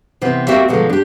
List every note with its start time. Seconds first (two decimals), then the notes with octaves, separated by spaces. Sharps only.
0.21 C3 E3 B3 C4
0.48 A#3 C4 F#4 G4 D5 E5
0.68 B2 D3 F3 F#3 G#3
0.89 D4 G4